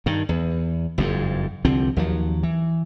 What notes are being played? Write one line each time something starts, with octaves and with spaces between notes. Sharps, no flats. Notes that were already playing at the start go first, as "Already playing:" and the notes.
G2 D#3
E2
F#1 F2 G#2
C2 D3 F3 C4
D#2 F3 F#3
E3